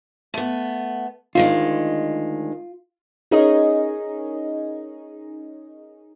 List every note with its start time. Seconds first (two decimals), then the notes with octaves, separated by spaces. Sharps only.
0.34 A3 B3
1.35 D2 D#3 G#3 F4
3.31 C#4 D#4 G#4 A#4 C#5 D#5